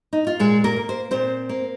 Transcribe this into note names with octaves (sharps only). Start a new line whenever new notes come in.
D#4
F4
A#2 G#3 G#4
A#3 A#4
A#3
C5
A#2 C4 C5
A#3